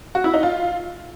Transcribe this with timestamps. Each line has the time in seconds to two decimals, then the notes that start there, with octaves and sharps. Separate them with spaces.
0.15 F#4
0.24 E4
0.34 D#4
0.43 F4